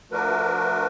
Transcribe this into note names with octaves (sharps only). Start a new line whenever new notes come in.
F3 A3 D4 F#4 A#4 B4